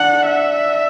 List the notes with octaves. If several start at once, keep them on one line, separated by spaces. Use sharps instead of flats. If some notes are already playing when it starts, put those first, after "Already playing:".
Already playing: D4 F#5
E5